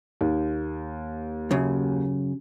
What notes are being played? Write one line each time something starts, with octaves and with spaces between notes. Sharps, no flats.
D#2
F#2 C#3